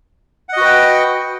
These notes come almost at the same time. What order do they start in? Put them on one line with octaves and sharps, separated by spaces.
F#5 D#5 F#4 B4 G5